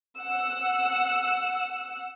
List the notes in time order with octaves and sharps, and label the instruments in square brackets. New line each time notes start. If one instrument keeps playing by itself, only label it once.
[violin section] F#5 E6